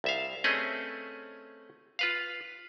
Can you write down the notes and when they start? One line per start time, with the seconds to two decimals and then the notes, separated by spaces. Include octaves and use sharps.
0.04 C2 E5 F5
0.44 A3 C4 C#4 G#4 B4 D#5
1.99 F4 B4 F5